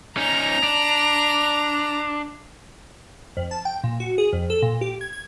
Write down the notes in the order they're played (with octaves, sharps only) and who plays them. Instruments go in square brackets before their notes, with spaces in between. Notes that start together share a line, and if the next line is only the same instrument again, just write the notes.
[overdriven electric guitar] C#4 D#4 [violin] A#5 F7
[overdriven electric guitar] D4
[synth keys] F2
A5
G5
A#2
F#4
G#4
F2
A4
A#2
G4
G#6
G#6